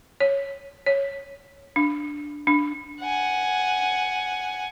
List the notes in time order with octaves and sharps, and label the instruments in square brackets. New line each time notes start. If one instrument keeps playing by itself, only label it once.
[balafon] C#5
C#5
D4
D4
[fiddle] F#5 G#5